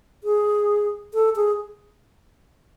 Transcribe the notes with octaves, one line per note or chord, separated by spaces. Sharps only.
G#4
A4
G#4